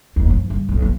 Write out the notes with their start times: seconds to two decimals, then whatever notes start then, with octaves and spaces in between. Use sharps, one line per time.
0.16 F1 D#2
0.29 G2 F3
0.50 G2 C#3
0.69 E1 B1
0.82 F3 B3